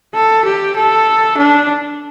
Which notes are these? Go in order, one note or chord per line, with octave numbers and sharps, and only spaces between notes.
A4
G4
A4
D4